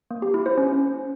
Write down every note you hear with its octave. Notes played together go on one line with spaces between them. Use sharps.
A#3
G4
E4
C5
C#4